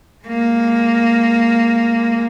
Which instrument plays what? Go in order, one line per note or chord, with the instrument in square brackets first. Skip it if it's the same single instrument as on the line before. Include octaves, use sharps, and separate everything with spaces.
[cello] G#3 A#3